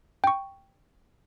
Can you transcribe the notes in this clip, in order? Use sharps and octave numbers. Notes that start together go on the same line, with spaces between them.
G5 C#6